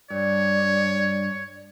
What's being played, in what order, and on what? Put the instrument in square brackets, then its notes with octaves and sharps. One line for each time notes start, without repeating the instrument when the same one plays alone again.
[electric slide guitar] G2 [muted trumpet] C#5 [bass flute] D5